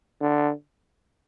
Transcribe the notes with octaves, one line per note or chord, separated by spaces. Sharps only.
D3